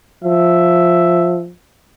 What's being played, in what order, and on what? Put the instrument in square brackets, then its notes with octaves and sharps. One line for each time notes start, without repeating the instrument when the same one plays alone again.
[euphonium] F3 [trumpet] E5